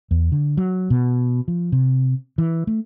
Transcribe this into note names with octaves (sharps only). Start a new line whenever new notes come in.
E2
D3
F#3
B2
F3
C3
E3
A3